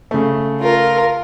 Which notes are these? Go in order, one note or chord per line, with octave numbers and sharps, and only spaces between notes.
C#3 A3
F4 A#4